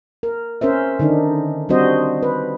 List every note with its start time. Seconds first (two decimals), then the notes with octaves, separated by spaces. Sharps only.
0.23 A#4
0.61 C#4 A#4 C5 E5
0.99 D3 D#3 D4 D#4
1.69 G3 C4 D4 F#4 C5 D#5
2.23 B4